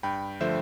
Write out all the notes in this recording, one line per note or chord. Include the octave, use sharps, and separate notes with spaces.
G2 G5 B5
D3 F3 A3 C5 E5